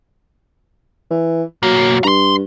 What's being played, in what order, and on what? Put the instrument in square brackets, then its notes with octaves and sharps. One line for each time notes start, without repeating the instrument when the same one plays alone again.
[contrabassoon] E3
[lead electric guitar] B1 A#3 [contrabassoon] F#3
[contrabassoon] G2 [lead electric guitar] A#5 C6